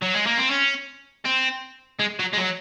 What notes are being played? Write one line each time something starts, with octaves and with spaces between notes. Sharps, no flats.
F#3
G#3
A#3
C4
C#4
C4
G#3
F#3
G#3
F#3